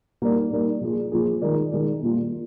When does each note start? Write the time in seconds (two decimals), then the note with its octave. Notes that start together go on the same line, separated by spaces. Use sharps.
0.22 G3 A#3 D#4 A#4 D5
0.52 G3 A#3 D#4 A#4 D5
0.81 F3 A#3 F4 G#4
1.12 F3 A#3 F4 G#4
1.41 D#3 G#3 D#4 A#4 D5
1.72 D#3 G#3 D#4 A#4 D5
2.02 A#2 G3 A#3 F4